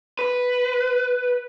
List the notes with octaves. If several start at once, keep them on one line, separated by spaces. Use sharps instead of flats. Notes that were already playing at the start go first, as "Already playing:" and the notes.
B4